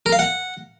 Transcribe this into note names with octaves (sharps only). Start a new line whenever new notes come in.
A#4
F5
F#5